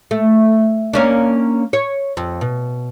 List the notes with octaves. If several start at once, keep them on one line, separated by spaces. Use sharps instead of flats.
A3
A#3 C#4 D4
C#5
F2
B2